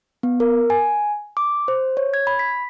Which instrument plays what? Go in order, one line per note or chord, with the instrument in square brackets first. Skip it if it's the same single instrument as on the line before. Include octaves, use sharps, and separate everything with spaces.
[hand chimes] B3
A#4
G#5
D6
C5
C#5
G#6
B5
B6